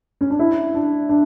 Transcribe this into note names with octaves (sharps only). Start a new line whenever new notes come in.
C#4
D4
E4
D4
D4